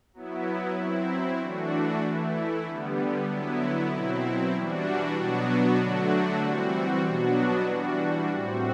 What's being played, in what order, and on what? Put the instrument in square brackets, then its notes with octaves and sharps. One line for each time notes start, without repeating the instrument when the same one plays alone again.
[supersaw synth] F#3 B3 E4
F#3 C4 E4
E3 A3 D4 F#4
E3 A3 E4
D3 G3 B3
D3 F#3 B3 E4
B2 F#3 C4 E4
E3 G3 D4 F#4
B2 F#3 B3 D4 F#4
D3 F#3 A3 D4 F#4
E3 G3 C4 F#4
B2 F#3 B3 D4 F#4
E3 G3 D4 F#4
A2 G3 C4 F#4